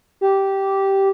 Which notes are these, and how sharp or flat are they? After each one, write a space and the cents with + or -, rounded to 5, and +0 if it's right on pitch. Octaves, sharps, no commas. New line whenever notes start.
G4 -10